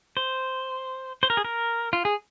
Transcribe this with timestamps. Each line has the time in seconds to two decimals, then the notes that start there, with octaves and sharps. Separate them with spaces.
0.17 C5
1.23 C5
1.30 A#4
1.37 G#4
1.45 A#4
1.93 F4
2.05 G#4